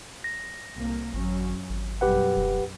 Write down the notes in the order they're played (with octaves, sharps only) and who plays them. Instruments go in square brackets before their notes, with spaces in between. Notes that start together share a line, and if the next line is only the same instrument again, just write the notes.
[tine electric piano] A#6
[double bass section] C2 A2 A#3
[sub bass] G#1 [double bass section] F#2 F#3 C#4
[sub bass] G#1
[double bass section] B1 F#2 G3 [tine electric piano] G4 B4 F#5
[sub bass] E1